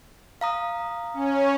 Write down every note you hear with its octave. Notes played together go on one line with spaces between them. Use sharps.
F5 A#5 D#6
C#4